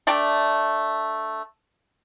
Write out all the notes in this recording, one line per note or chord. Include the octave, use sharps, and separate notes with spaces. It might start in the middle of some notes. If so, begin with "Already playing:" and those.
A3 D4 D5 G5